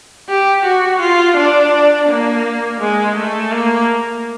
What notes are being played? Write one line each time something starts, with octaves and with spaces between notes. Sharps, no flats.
G4
F#4
F4
D4
A#3
G#3
A3
A#3